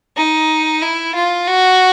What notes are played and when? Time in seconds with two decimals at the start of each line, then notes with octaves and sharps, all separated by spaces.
0.17 D#4
0.82 E4
1.15 F4
1.47 F#4